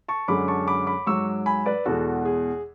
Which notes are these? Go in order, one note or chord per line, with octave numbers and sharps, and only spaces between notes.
A5 C#6
F#2 D3 G#3 B5 D6
A5 C#6
B5 D6
B5 D6
G#2 F#3 C#6 E6
G#5 B5
B4 D5
E2 B2 G#3 F#4 A4
G#4